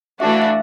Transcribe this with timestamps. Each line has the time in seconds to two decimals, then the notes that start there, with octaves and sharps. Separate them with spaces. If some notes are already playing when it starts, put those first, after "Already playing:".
0.20 E3 A3 D4 F#4 E5
0.31 F5
0.42 E5